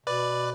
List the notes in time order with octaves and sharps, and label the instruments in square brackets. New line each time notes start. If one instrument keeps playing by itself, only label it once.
[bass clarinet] B2 [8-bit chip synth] B4 D5